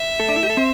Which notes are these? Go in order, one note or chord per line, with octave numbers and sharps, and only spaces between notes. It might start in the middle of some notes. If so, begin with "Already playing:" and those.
Already playing: E5
A3 A4
D4
E4
G4
A4
C4 C5